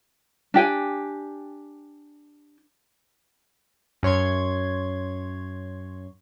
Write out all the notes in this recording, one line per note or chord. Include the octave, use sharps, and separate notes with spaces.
D4 G4 G5 G#5
F#2 C#5 C6 G#6